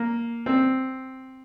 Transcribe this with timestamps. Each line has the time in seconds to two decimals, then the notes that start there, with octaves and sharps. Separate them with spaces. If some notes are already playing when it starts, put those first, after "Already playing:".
Already playing: A#3
0.46 C4